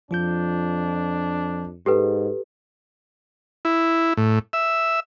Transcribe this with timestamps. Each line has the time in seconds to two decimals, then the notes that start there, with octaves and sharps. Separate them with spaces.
0.11 F2 F3 D4 F4 G6
1.86 G#2 G4 A4 B4
3.65 E4
4.17 A2
4.53 E5